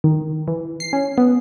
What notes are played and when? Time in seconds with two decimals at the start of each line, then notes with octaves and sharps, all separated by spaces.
0.04 D#3
0.48 E3
0.80 C7
0.93 C#4
1.18 B3